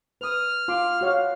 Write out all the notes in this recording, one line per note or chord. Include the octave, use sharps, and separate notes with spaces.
B4 D#6 F6
F4 C6 D6
F#4 C#5 F5